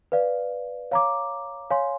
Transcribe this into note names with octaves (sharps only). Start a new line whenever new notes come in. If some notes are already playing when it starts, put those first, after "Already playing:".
B4 D5 F5
C#5 F5 A#5 D6
C#5 F5 G#5 C6